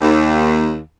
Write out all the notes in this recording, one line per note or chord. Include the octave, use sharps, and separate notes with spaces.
D#2